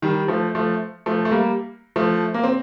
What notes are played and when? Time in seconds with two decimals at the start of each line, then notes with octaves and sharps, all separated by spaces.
0.02 D#3 G3
0.28 F3 A3
0.55 F3 A3
1.06 F3 A3
1.25 A3
1.31 G3 A#3
1.96 F3 A3
2.34 A#3
2.44 C4